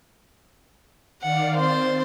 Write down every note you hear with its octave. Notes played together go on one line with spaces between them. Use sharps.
D#3 D5 F5 F#5
C4 C5 C6 A6